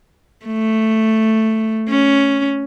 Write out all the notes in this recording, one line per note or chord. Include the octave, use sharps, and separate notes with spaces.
A3
C#4